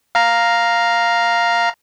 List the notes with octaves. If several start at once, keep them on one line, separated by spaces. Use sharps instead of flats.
F5 A#5